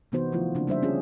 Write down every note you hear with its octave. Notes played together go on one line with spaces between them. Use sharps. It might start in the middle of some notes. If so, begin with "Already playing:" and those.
C3 E3 B3 D#4 F#4 C5
D#3 F3 A3 E4 F4
C#3 A#3 C4 D4
G3 D4 C5 E5
C#4 F4 G4 G#4